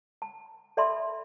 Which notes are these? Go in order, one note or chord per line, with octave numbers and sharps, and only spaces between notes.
A5
A4 D5 E5 A5 B5 C6